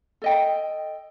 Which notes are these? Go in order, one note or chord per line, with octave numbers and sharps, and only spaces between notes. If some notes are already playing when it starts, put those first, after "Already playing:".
A4 D#5 G5